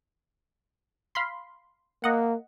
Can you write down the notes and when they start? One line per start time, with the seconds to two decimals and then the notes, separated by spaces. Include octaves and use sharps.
1.15 F5 B5 C6
2.04 A#3 D#5 F#5